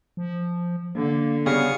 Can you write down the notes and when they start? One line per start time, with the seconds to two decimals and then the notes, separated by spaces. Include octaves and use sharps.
0.17 F3
0.95 D3 A#3
1.46 C#3 G3 B3 G#4 F5 C#6 D#6